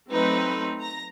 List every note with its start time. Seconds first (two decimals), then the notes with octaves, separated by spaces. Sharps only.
0.12 F#3 A3 C4 D#4 B4
0.79 A#5 A#6